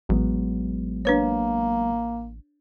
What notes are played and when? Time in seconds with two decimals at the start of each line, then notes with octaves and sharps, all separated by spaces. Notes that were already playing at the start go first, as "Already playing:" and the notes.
0.09 A1 F#3 G#3 B3
1.05 A#3 D4 B4 C#5